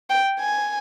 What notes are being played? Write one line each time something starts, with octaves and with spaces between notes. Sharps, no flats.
G5
G#5